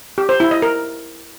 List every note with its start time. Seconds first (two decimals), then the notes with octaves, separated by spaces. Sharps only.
0.18 G4
0.29 C5
0.40 E4
0.51 D#5
0.62 A#4